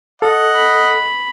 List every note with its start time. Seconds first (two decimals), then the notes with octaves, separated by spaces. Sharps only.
0.22 A4 D#5 F#5
0.56 B5